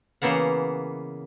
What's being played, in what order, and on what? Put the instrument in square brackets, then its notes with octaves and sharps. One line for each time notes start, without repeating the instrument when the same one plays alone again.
[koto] C#3 E3 A#3 B3 F#5